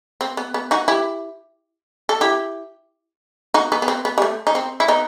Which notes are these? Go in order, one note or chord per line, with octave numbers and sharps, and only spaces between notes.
C4
B3
B3
D#4 F#4
E4 G4
A4
E4 G4
D#4 F#4
B3 D#4
B3
C4
B3
G3
A3
D#4
C4
E4
B3 D#4